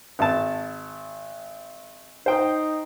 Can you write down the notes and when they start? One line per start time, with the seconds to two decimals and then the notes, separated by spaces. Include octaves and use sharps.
0.19 G#1 A5
2.26 D#4 C5 G5